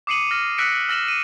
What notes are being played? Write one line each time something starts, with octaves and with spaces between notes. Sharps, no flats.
D6 D#6 C7 C#7 D#7 F#7
F6 A#6
E6 F#6 A#6 B6 C#7 D7
E6 F6 A#6 E7 F#7
D#7